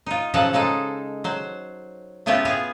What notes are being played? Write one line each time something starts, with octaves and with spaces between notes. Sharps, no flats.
D#4 F4
C#3 F3 F#3 A4 D#5 F#5
C#3 G#3 D#4 A4
F#3 C5
C#3 A3 B3 E4 F4 G4
B3 G#4 F5